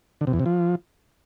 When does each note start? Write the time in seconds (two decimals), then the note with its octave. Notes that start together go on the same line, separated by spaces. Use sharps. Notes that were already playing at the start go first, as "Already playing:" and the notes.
0.21 D3
0.27 C3
0.33 E2
0.39 C3
0.46 F3